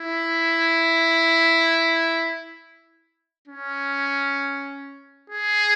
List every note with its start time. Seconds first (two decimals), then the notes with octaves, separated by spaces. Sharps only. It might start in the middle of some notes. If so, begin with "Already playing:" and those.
Already playing: E4
3.48 C#4
5.30 G#4